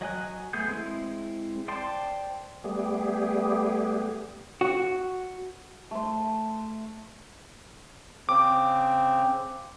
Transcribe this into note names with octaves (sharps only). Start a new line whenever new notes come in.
F#3 D#5 G#5 F#6
A3 B3 G#4 G6
G#3 C4 E4
C5 D5 G5 A5 C6
G3 A3 B3 G4 G#4
F#4
A3 C6
C#3 C4 D6